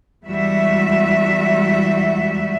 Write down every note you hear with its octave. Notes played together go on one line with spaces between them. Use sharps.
E2 G3 G#3 F#4 E5